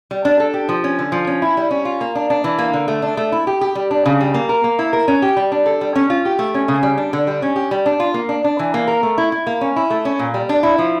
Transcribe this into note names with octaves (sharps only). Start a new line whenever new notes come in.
G3
D4
A4
G4
F3
C#4
D3
F3
C#4
E4
G3
C#4
F4
A#3
D4
D4
E3
A#3
D3
A3
D4
A3
E4
G4
G4
G3
D4
C#3
G3
A#3
A#4
A#3
E4
A#4
C#4
G4
G3
D4
A4
G3
C#4
F4
G4
A3
C#4
C#3
G3
D4
D3
G3
C#4
G4
G3
D4
F4
A#3
D4
D4
E3
A#3
A#4
A3
E4
E4
A#3
C#4
E4
A3
C#4
A#2
G3
D4
E4
F3